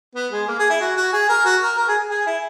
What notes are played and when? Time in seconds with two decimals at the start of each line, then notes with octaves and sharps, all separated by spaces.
0.15 B3
0.32 G#3
0.47 A#3
0.59 G#4
0.70 E4
0.81 F#4
0.97 F#4
1.13 G#4
1.29 A#4
1.45 F#4
1.62 A#4
1.78 A#4
1.88 G#4
2.10 G#4
2.27 E4